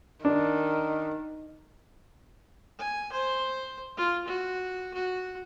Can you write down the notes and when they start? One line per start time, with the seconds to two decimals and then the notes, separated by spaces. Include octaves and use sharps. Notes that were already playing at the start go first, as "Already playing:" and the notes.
0.25 D#3 D4
2.78 G#5
3.12 C5
3.97 F4
4.27 F#4
4.94 F#4